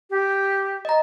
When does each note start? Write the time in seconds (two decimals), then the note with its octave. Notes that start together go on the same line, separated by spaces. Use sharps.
0.10 G4
0.85 D#5 A#5